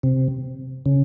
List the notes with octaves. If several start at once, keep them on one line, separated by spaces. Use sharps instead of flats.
C3
C#3